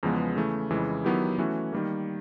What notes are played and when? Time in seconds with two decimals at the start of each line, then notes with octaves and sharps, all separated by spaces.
0.03 E2 C#3 F3 G#3 B3
0.36 C#3 E3 A3
0.70 F2 C#3 E3 G#3
1.05 D#3 F#3 B3 E4 G4
1.39 E3 A3 C#4 F#4
1.73 D#3 G3 A#3